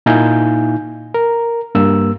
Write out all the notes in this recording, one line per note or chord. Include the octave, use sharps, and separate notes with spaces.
A#2 D#4 E4 F5 G#5 G6
A#4
G2 A#3 E6